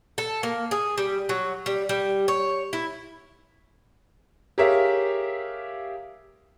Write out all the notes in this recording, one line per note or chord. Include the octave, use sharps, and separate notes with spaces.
A4
A#3
G#4
G3
F#3
G3
G3
C#5
E4
G4 G#4 A#4 C#5 E5 F5